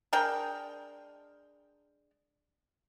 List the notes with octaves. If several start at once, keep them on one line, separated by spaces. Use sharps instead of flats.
G#3 D4 A#4 G5